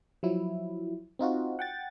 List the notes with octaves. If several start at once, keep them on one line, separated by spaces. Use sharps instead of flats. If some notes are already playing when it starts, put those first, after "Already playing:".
F3 F#3 E4
C4 D#4 F4 F#4
F#5 G5 A6